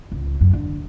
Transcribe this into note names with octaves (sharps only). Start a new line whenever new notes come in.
C#2
F#2
D3